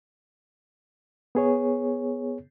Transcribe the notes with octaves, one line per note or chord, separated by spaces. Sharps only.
B3 G#4 C#5